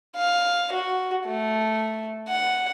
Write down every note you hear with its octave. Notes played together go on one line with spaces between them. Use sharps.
F5
F#4
A3
F#5